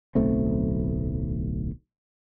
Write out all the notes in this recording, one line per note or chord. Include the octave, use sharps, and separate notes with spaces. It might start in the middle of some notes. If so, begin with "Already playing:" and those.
D1 B1 A3 C4